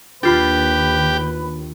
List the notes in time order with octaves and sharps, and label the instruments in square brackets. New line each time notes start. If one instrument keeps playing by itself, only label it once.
[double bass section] D#2 [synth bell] D4 F4 B5 [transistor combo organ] G4 [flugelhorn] B4